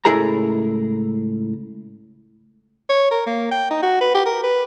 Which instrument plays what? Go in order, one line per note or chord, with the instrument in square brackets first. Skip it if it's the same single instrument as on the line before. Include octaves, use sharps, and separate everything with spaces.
[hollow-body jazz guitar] C#2 A2 E4 G#4 A#4 A#5
[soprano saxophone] C#5
A#4
A#3
G5
D#4
F#4
B4
G4
A#4
B4